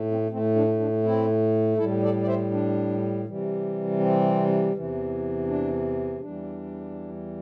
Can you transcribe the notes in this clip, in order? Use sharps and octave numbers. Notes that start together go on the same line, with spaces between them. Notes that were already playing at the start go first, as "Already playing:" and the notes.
Already playing: A2 A3
C4
A2 A3 C4
D4
D4
C4 E4
A2 G3 E4 A4
A4 D5
D5
C5 E5
D4
C3 E3 G3
C4
E2 C3 E3
D4
E2 E3 G3 D4